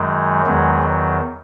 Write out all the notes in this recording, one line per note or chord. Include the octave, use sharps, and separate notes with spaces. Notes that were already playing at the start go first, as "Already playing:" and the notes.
Already playing: F#2 D#3 F#3 G#3
E2 D#3 F#3 G#3
F#3